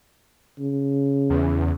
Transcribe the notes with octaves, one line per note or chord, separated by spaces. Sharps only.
C#3
E2